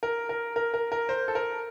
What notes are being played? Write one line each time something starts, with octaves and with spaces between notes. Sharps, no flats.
A#4
A#4
A#4
A#4
A#4
C5
A4
A#4